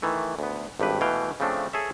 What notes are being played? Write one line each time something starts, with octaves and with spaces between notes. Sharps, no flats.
D#3 E3 A3
D2 B3
G#1 G2 G4 B4
B2 E3 A3 F5 G5
C#3 F3 A3 C4 D4
G#4 A4 C#5 E5